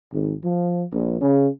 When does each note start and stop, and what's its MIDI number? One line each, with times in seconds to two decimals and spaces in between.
0.12 0.33 32
0.43 0.83 53
0.92 1.19 34
1.21 1.48 49